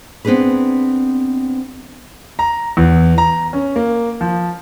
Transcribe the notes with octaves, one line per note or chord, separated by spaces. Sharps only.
B3 C4 D4 G#4 B4
A#5
E2
A#5
C#4
A#3
F3